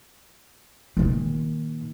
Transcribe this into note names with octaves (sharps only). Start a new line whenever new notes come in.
A#2 D#3